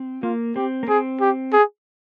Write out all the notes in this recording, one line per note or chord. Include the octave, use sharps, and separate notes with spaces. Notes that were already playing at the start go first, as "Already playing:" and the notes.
Already playing: C4
A#3 F4
C4 G4
A#3
C4 G#4
G4
G#4